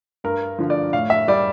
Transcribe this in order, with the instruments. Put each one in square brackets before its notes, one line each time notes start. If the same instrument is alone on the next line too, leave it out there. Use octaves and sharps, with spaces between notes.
[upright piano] G2 A#4
D3 F3
D5
A2 F5
E5
G3 D5